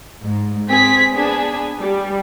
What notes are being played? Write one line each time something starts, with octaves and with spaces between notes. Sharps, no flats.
G#2
C4 G#4 B6
B3 D4 G#4
G3